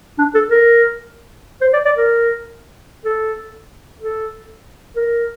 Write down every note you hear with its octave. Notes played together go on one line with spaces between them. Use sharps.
D4
A4
A#4
C5
D5
D5
A#4
A4
A4
A#4